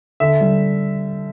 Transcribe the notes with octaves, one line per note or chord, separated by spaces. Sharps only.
D3 E5
G3